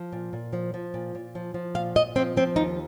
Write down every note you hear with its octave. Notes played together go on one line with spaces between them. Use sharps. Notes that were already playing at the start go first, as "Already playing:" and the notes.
Already playing: F3
A#2
A#2
F3
F3
A#2
A#2
F3
F3
A#2 F5
A#2 D#5
F3 C4
F3 C4
D#2 D#4